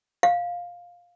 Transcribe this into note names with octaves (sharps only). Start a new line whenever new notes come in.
F5